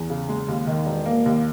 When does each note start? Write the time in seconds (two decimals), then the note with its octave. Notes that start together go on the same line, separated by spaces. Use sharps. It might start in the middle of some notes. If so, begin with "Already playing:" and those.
Already playing: E2
0.10 C#3
0.29 G#3
0.48 D#2
0.67 D#3
0.86 E1
1.06 A#3
1.26 D#2